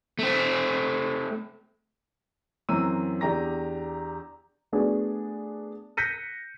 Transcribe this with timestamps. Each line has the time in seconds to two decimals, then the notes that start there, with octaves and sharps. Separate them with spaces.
0.19 A3 C4
2.69 F#2 E3 F#3 C4 E6 D#7
3.21 E2 D4 G4 A#5 A#6
4.72 A3 B3 D4 F#4 G#4
5.97 F#6 G6 A#6 B6 C#7 D#7